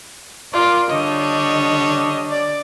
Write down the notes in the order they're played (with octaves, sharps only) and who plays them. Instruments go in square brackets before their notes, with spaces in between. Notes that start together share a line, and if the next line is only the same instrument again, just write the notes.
[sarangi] F4 [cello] A#4 D5
[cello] D3 [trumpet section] G3 D4 C#5 [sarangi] D#5
[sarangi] D5